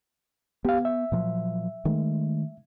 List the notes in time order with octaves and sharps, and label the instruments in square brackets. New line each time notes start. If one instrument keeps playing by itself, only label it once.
[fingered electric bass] B3 [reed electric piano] G4 F5
[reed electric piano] E5
[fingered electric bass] A#2 F3 F#3
D#3 G#3 A3